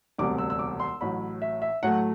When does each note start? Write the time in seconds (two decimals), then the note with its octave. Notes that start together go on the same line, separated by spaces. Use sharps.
0.18 E1 D2 C3 G3 D6
0.38 E6
0.50 E6
0.59 D6
0.80 C6
1.01 A1 A2 F#3 B5
1.42 E5
1.62 E5
1.83 A2 F#3 A3 F#5